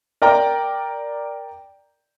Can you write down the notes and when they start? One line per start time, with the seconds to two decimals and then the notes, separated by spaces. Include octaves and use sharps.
0.22 A#4 D5 G5 A#5